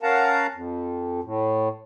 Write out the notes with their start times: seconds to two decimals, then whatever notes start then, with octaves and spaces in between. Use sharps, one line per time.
0.03 C#4 A#4 F5 F#5 A5 A#5
0.54 F2
1.23 A2